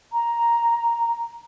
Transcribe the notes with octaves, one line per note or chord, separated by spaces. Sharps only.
A#5